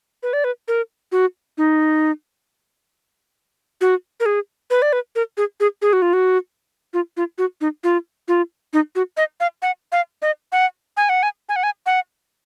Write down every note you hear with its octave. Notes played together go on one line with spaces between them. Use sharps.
B4
D5
B4
A#4
F#4
D#4
F#4
A#4
G#4
B4
D5
B4
A#4
G#4
G#4
G#4
F#4
F4
F#4
F4
F4
F#4
D#4
F4
F4
D#4
F#4
D#5
F5
F#5
F5
D#5
F#5
G#5
F#5
G#5
G#5
F#5
G#5
F#5